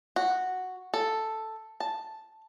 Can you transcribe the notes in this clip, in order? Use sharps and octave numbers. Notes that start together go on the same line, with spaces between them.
F#4
A4
A5